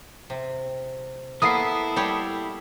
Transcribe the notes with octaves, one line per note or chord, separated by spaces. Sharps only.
C3
A#3 B3 E4 A4 D#6 C7
G3 G4 C#5